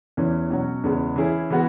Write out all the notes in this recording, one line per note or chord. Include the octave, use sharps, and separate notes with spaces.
E2 E3 C#4
B2 F#3 C#4 F#4
E2 C#3 G#3 B3
E3 C#4 E4 G#4
E3 G#3 B3 F#4